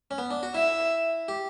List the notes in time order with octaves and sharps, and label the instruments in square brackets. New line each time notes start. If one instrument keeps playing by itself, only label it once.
[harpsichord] C#4
B3
D4
F#4
[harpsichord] E4 [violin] E5
[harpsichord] G4